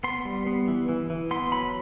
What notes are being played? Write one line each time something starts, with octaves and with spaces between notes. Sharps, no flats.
B3 C6
G3
B3
E3
E3
E3
B3 C6
F#3 B5